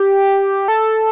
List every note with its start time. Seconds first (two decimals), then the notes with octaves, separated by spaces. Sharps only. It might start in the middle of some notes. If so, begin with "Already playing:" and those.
Already playing: G4
0.68 A4